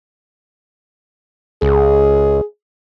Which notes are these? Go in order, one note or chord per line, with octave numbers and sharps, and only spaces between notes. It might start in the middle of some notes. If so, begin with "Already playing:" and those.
C#2 G#4